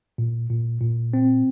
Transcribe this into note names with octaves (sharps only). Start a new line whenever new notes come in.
A#2
A#2
A#2
C4